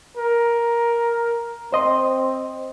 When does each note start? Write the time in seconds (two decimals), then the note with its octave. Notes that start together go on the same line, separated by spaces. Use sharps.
0.17 A#4
1.72 C4 C5 D#5 C6